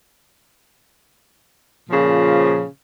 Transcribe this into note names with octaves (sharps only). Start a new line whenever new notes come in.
A#2 C#3 F3